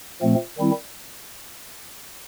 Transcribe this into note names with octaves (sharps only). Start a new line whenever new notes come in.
A#2 F3 A3 C4
D#3 G3 C4 E4